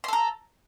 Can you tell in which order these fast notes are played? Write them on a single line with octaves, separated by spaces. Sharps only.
C6 A4 A#5